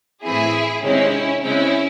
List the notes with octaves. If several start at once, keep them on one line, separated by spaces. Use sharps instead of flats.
A2 E3 C4 E4 G#4
C3 D#3 G#3 C4 C#4 E4
C#3 G#3 C4 C#4 E4